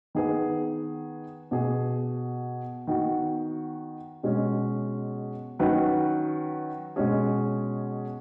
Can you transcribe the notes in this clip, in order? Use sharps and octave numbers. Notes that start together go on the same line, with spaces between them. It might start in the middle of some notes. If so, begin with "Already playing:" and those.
D#3 B3 G#4 B4
B2 B3 G#4
D#3 B3 F#4
B2 G#3 C#4
D#3 F#3 C#4 B4
B2 G#3 C#4 G#4